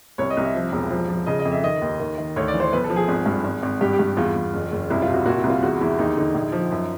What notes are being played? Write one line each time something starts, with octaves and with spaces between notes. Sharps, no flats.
C2 C#5
D#5
C2
E5
F3
E1
F3
F3
C#3 D#5
D#5
F2
E5
D#3 D#5
D#2
D#3
D#3
D2 C#5
D5
E3
C5
B1 B4
A4
F3
G#4
G#1
G2
G#1
G#1
G2 G4
G4
G2
E2 F4
E2
F#1
F#1
C2 E4
F4
C3
F#4
A#2 F#4
E4
C2
F4
E2 F#4
E2 E4
D#2 D#4
D3 D#4
A#1
F3
F#2